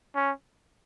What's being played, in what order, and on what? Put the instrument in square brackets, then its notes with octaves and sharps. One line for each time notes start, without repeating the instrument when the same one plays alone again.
[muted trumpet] C#4